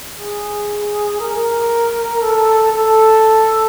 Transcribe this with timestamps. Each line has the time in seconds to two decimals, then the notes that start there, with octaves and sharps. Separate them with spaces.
0.18 G#4
1.20 A#4
2.22 A4
2.73 A4